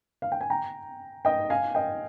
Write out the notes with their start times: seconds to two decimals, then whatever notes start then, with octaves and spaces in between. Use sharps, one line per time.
0.22 F5
0.32 G5
0.41 G#5
0.50 G5 A#5
1.25 D#5 G5
1.50 F5 G#5
1.75 D#5 G5